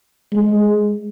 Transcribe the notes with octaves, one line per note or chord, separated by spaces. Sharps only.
G#3